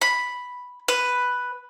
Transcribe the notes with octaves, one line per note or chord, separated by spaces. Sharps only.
B5
B4